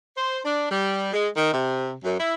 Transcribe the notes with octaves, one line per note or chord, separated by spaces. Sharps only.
C5
D4
G3
G#3
D#3
C3
F#2
E4